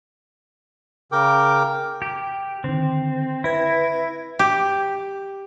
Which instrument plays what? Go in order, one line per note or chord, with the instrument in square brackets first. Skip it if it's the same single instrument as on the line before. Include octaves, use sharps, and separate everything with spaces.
[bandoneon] C#3 A#4 G5 D6
[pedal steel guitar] G4
[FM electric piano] D3 D#3 [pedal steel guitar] C4
[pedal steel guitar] E4 [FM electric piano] B4 G#6 A#6
[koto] G4